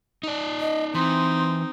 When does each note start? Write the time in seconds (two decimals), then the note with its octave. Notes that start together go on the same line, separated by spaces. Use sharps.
0.23 D#4 D5
0.60 D#5
0.95 E3 C4 D#4 C6